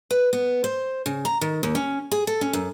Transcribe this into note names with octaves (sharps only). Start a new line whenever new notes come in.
B4
B3
C5
C#3
A#5
D#3
D#2
C#4
G#4
A4
C#4
F#2